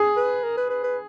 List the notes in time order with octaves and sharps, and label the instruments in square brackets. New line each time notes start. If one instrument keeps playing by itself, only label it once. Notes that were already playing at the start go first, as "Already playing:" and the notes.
Already playing: [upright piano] G#4
[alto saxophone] B4
A#4
B4
B4
B4